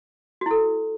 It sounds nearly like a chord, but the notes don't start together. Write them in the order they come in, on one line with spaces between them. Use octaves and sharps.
F#4 E4 A4